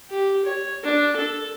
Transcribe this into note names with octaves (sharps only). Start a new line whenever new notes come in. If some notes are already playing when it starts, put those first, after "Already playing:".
G4
C#5
D4
A4